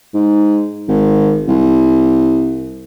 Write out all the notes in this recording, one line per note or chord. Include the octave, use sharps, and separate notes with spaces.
G#2
G#1
C2